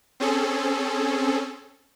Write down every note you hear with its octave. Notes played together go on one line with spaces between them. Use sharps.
C4 C#4 G#4 A4